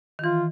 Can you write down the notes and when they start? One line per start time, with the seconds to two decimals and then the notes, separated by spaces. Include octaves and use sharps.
0.19 D#3
0.24 E3 F4